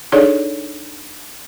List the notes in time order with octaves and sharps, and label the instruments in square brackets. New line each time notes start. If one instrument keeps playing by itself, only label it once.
[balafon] D4 D#4 G#4 A4 C#5 D5